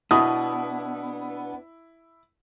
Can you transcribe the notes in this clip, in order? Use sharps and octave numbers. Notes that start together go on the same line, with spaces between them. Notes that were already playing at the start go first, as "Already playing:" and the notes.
B2 B3 D4 E4 D#6